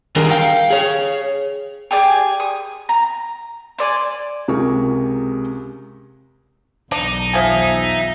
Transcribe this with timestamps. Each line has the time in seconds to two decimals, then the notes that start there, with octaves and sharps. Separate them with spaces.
0.16 D#3 G3 D4 G#4 A#4
0.31 F5 G5
0.71 G#4 C#5
1.91 G4 G#4 D5 G#5
2.40 D#6
2.89 A#5
3.79 C5 D5 G#5
4.48 C#2 C3 G#4 A#4 C#6
6.92 B1 E2 D4 D#4
7.33 F3 G#4 E5